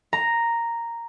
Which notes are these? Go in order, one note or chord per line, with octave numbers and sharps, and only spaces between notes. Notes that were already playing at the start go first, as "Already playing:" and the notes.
A#5